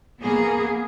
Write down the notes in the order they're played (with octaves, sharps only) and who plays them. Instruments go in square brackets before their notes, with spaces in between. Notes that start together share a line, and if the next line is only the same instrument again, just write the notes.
[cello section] A#3 B3 G#4